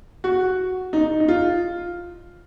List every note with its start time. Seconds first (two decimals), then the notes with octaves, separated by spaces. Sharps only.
0.24 F#4
0.93 D#4
1.20 D#4
1.28 F4